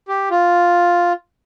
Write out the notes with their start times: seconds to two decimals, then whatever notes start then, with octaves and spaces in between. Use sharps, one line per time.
0.08 G4
0.30 F4